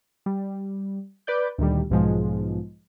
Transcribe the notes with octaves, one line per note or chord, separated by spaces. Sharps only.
G3
B4 D5 G6
D2 A#2 D#3 G3
B1 G#2 B2 F3 G#3